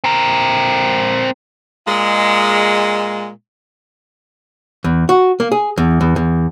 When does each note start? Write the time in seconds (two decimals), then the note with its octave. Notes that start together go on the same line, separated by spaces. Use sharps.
0.04 C4 A#4
1.86 A#2 G#3
4.84 E2
5.09 F#4
5.40 A#3
5.52 G#4
5.78 E2
6.01 E2
6.16 E2